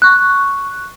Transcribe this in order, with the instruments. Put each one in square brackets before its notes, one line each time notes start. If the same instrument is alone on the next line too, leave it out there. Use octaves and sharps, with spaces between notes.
[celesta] C#6 F#6